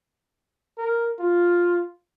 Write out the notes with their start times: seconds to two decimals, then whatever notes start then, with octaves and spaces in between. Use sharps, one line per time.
0.78 A#4
1.19 F4